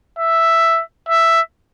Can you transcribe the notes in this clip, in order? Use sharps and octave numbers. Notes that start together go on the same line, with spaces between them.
E5
E5